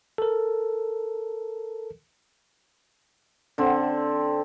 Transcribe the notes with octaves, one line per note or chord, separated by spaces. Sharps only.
A4 A#4
D3 C4